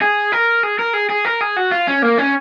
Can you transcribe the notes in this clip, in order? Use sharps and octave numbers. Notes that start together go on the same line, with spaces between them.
G#4
A#4
G#4
A#4
G#4
G#4
A#4
G#4
F#4
F4
C#4
A#3
C#4